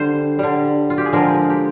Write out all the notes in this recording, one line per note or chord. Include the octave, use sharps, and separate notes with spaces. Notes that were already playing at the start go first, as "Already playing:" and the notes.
Already playing: D3 G3 C5
D3 G3
F4
G4
G#4
D3 F3 G#3 A#4
G4